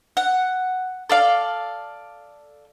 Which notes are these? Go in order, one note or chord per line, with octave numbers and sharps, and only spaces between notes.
F#5
A4 D5 F5